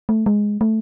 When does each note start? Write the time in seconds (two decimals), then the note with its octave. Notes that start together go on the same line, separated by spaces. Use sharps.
0.09 A3
0.26 G#3
0.61 A3